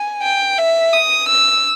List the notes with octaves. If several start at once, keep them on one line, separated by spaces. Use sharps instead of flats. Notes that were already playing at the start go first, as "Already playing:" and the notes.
Already playing: G#5
G5
E5
D#6
E6